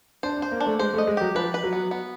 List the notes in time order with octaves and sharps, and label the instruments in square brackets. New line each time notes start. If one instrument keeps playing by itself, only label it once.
[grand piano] D4 [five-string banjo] C5
[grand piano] D4
[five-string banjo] C5
[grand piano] A#3
[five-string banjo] D4
[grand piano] A3
[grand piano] G#3 [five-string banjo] C5
[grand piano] A3
[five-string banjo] D#5
[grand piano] G#3
[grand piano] F#3 [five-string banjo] G4
[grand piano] F3 [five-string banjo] B4
[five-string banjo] B4
[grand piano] F#3
[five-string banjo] B3
B3